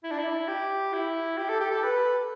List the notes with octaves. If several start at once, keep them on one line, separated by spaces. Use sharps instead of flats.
E4
D4
E4
G4
E4
G4
A4
G4
A4
B4